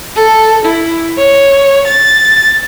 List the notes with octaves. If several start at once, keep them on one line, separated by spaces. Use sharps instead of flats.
A4
E4
C#5
A6